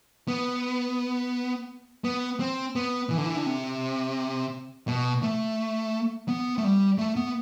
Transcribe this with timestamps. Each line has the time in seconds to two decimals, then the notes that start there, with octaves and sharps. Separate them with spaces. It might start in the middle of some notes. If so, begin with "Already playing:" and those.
0.28 B3
2.04 B3
2.40 C4
2.76 B3
3.10 E3
3.17 D3
3.25 E3
3.37 D3
3.46 C3
4.88 B2
5.23 A3
6.28 B3
6.58 A3
6.64 G3
6.98 A3
7.16 B3